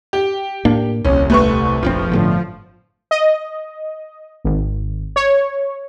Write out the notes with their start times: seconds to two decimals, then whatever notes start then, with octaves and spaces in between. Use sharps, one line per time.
0.13 G4
0.65 A2 A#3 D4
1.05 D#1 C2 C#4
1.30 A3 B4 C#6
1.83 F1 A#1 F3 C4
2.12 G1 A2 D3
3.11 D#5
4.44 G#1
5.16 C#5